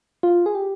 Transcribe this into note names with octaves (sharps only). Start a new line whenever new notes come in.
F4
G#4
G4